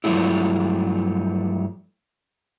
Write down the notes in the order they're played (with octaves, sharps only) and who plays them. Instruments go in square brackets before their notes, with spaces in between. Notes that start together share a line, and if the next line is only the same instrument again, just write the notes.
[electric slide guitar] G2 F3 F#3 G#3 A3 E4